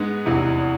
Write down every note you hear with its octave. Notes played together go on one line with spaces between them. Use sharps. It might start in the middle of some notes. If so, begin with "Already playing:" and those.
Already playing: G#2 G#3 B3 D4
F1 E2 C3 E3 E4